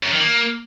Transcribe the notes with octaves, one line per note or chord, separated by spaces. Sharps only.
F#2
D#3
A#3